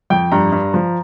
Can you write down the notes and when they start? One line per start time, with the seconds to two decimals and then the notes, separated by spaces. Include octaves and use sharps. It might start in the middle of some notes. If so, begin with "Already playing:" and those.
0.10 F2 G5
0.32 G2 A#5
0.52 G2
0.74 F3